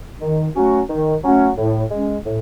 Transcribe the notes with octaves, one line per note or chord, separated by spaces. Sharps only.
D#3
F#3 A3 C#4 F#4
D#3
F#3 A3 C#4 F#4
A2
G#3 C#4
A2